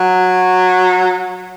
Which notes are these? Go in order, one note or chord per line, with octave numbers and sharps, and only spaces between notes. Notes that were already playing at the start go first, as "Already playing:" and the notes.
Already playing: F#3